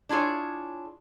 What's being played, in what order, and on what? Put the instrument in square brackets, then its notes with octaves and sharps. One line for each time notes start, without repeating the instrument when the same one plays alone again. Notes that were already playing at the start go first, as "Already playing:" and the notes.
[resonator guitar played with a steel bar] D4 E4 F4 G#4 C#5